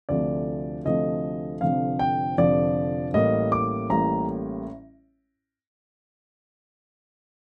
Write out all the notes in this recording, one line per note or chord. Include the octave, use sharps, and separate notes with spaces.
D2 C3 F3 A3 D5
D2 C3 F3 A3 D#5
F1 F2 D3 F3 F5
G5
F1 F2 D3 F3 D5
A1 A2 G3 A#3 D#5
D6
A1 A2 G3 A#3 A#5